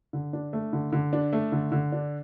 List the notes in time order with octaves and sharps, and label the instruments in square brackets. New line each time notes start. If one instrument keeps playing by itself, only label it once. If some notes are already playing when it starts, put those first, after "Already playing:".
[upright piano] D3
D4
A3
D3
D3
D4
A3
D3
D3
D4